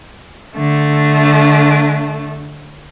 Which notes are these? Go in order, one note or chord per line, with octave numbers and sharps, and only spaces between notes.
D3 A3